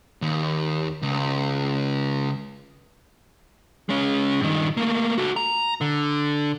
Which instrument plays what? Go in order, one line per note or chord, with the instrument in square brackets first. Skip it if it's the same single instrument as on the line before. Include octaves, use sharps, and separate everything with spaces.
[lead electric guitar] D#2
C#2
G#3 C#4
G2 D#3
A3 A#3
F#4 A4
A#5
D3